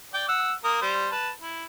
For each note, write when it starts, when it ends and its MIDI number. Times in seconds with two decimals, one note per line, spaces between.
0.14 0.25 74
0.14 0.25 79
0.14 0.25 86
0.28 0.52 78
0.28 0.52 88
0.64 0.79 58
0.64 0.79 70
0.64 0.79 87
0.82 1.08 55
0.82 1.08 72
1.12 1.30 71
1.12 1.30 81
1.41 1.64 64